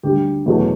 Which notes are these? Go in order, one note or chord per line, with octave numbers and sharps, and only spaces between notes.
D2 D3 G3 G4
E2 B2 F#3 A3